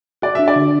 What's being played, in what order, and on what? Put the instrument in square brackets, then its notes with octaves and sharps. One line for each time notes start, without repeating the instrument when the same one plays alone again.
[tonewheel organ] F#4 [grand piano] D5
[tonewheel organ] D4 [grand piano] E5
[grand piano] D5
[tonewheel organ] D3